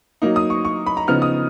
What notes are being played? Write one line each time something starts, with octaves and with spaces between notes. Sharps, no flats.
F#3 A#3 D#4
D#6
C#6
C#6
B5
A#5
C#3 F3 B3 D#4 F6
D#6